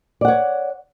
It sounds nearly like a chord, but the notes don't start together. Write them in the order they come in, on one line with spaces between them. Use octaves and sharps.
D5 F#5 C#5